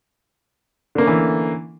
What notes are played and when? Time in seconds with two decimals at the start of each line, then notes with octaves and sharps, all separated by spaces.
0.95 D3
0.98 A#3
1.01 C#4
1.04 A3
1.07 E3